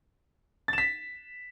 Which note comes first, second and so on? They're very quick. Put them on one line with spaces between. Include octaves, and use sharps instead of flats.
A6 E7 B6